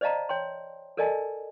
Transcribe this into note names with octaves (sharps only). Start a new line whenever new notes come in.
C5 D5 D#5 F5 A5 A#5
C#5 G5 C6
A4 A#4 D5 D#5 G#5 A5